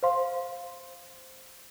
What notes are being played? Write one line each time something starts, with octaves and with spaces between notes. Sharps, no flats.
C5 F5 C6